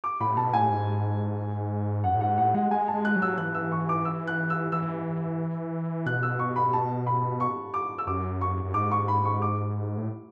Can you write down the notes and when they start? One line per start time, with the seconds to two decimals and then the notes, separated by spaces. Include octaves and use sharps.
0.04 D6
0.20 A2 B5
0.37 B2 A5
0.53 A2 G#5
0.70 G#2
2.04 F#2 F#5
2.15 A2
2.21 G#2 F#5
2.37 A2 F#5
2.54 G#3 F#5
2.71 G#3 G#5
2.88 A5
2.94 G#3
3.05 F#6
3.16 F#3
3.22 E6
3.38 E3 F#6
3.54 E6
3.72 C#6
3.89 D6
4.05 E6
4.27 F#6
4.50 E6
4.72 E3 E6
6.06 B2 F#6
6.23 E6
6.39 C#6
6.56 B5
6.73 A5
7.06 B5
7.40 C#6
7.74 D6
7.98 E6
8.07 F#2 D6
8.41 C#6
8.64 F#2
8.74 G#2 D6
8.91 C#6
9.08 B5
9.25 C#6
9.42 D6
9.97 A2